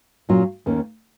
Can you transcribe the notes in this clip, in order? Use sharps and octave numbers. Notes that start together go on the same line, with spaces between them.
A#2 F#3 C#4 F4
D#2 D#3 A#3 C#4